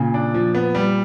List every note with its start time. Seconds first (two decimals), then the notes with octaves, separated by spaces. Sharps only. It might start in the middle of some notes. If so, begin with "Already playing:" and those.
Already playing: A#2 C#3
0.14 D4
0.34 F3
0.55 B3
0.75 G3